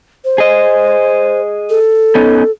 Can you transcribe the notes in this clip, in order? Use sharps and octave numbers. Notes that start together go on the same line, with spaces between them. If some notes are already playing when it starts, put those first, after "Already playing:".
C5
G#4 D#5
A4
B3 C#4 D#4